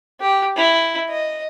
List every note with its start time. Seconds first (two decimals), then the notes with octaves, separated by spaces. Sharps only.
0.21 G4
0.56 E4
1.10 D#5